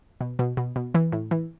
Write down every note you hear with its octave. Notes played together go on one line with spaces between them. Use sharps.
B2
B2
B2
B2
E3
A2
E3